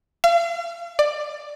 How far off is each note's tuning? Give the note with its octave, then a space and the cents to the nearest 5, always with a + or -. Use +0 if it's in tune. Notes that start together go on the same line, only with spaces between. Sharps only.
F5 -40
D5 +20